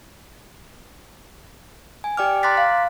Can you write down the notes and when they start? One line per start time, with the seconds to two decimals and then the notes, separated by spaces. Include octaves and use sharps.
2.04 G#5
2.17 G4 D5 G5 D6 F6
2.43 A#5 C6 D6 F#6 A6 B6
2.57 F5